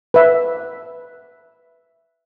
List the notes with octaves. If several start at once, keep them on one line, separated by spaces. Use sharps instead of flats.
B4 E5